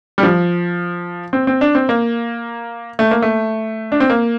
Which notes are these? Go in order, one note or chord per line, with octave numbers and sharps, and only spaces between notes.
G3
F3
C4
C4
D4
C4
A#3
A3
A#3
A3
D4
C4
A#3